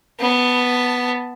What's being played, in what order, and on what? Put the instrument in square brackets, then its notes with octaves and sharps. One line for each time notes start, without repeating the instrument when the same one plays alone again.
[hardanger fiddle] B3 A5